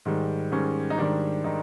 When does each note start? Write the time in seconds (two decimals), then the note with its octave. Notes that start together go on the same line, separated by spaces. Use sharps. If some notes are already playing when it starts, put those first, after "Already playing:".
0.05 G#2 D#3 G3
0.51 G#2 D#3 G3 C#4
0.90 D#4
0.98 G#2 D#3 G3 D4
1.44 D#3 D#4